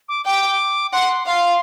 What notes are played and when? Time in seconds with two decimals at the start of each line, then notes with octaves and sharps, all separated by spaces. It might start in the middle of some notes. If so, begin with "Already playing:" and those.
0.08 D6
0.26 G5 D6
0.93 F#5 C6
1.27 F5 C6